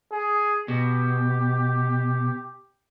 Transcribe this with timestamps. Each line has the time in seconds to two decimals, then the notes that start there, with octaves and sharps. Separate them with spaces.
0.12 G#4
0.68 B2 G4